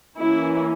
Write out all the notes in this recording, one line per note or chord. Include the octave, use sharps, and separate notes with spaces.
E3 A#3 C#4 E4